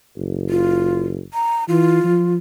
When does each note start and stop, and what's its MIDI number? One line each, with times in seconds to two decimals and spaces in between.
0.17 1.21 30
0.50 1.04 65
1.34 1.64 82
1.69 2.03 52
1.69 2.34 65
2.04 2.37 53